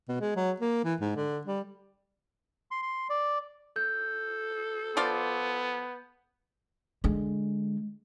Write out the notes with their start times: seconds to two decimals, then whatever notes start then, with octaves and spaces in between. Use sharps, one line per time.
0.09 B2
0.21 G#3
0.36 F#3
0.60 A#3
0.84 E3
1.00 G#2
1.16 D3
1.45 G3
2.71 C6
2.82 C6
3.09 D5
3.76 A4 G6
4.97 F3 B3 F4 D5
7.04 D3 G#3